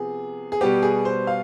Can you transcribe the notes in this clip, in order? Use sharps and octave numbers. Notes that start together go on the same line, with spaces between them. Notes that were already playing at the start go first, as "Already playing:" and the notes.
Already playing: C3 F3 B3 G#4
G#4
B2 G3 B3 G4
G#4
C5
F5